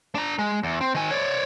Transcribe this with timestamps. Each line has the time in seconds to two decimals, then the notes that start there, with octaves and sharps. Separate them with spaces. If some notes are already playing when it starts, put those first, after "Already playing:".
0.15 D4 A#5
0.39 G#3
0.64 E2
0.81 C4
0.95 D#3 G#5
1.11 C#5 D5